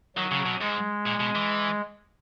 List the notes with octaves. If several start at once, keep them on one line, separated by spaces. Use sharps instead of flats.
D#3 F#3
C#3
B2
G#2 G#3
A#2
B2
E3